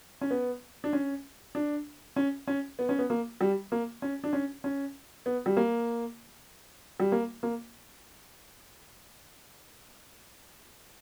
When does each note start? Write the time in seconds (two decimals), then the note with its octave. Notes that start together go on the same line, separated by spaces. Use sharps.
0.21 C#4
0.30 B3
0.84 D4
0.93 C#4
1.55 D4
2.16 C#4
2.47 C#4
2.79 B3
2.89 C#4
2.99 B3
3.10 A#3
3.41 G3
3.72 A#3
4.02 C#4
4.24 D4
4.33 C#4
4.64 C#4
5.26 B3
5.46 G3
5.57 A#3
7.00 G3
7.12 A#3
7.43 A#3